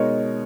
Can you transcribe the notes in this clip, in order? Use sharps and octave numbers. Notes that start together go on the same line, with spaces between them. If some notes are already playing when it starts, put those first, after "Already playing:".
Already playing: B2 G#3 D#4 A#4 C#5